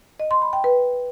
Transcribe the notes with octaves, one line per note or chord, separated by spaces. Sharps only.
D#5
C6
B5
G5
B4